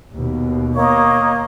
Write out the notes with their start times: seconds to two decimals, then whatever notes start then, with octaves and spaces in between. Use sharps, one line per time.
0.15 D#2 B2
0.74 A#3 C#5 D#5